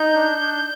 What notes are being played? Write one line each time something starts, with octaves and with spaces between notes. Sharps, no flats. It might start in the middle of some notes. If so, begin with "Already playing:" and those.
Already playing: D#4 G6
D4
D4